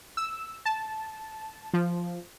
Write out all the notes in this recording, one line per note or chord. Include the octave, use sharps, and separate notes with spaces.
E6
A5
F3